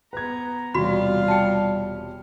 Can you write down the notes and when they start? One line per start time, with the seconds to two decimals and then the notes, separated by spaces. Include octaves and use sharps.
0.13 B3 B4 A#5 G#6
0.74 E1 C3 G3 F4 F#4 F5 B5
1.28 G5 A5